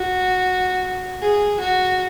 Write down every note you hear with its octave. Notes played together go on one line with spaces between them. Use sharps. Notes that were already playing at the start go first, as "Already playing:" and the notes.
Already playing: F#4
G#4
F#4